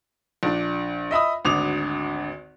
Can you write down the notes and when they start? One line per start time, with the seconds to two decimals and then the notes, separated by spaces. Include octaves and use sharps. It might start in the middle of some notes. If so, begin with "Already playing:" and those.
0.43 A#1 D4
1.11 D#5 E5 B5 D#6
1.45 G#1 D2 D3 D6 D#6 F7